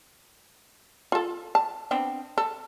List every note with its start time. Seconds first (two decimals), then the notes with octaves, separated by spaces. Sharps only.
1.12 F4 A4
1.55 A5
1.91 B3 C4 D4
2.38 A4